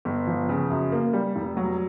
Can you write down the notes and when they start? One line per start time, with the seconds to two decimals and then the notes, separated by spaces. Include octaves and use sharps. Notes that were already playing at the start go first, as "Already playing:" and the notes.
0.05 G1
0.27 F3
0.49 C#3
0.70 F#2
0.92 A#3
1.13 G3
1.36 F1
1.57 F#3